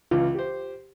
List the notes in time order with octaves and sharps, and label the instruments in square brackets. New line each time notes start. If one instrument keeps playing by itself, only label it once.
[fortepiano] C#2 E3 [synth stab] F4
[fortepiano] G4 C5